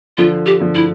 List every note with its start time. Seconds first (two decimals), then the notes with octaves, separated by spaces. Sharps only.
0.18 D3 F3 F4
0.46 G4
0.60 D3 F3
0.75 E4